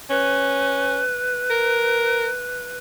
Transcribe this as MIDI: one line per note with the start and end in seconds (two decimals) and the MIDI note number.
0.10 1.01 61
0.10 2.78 71
1.51 2.29 70